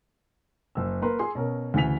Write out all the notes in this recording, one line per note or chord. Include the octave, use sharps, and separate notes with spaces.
F#1 E6
A#3 A#4 B4 C6
G#4 C6
B2 C#4 A#4
D2 C#3 E3 G#5 B6 F7